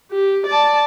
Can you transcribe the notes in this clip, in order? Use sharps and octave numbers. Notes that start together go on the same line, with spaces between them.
G4
D5 A5